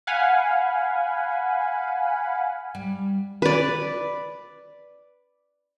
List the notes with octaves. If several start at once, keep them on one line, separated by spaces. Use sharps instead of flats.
F5 F#5 G#5 B5
G3
B4 D5